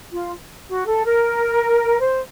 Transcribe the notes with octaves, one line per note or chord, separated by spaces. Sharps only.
F4
F#4
A4
A#4
C5